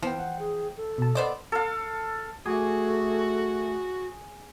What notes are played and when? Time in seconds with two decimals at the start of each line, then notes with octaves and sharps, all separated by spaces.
0.03 E3 F3 B3 G5
0.17 F#5
0.39 G#4
0.77 A4
0.98 B2 A5
1.15 B3 C5 D5 D#5
1.52 A4 F5
2.45 A3 F#4 G#4 G#5 D6